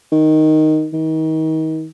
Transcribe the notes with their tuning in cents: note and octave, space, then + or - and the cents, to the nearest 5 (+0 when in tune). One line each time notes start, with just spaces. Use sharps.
D#3 +0
D#3 +35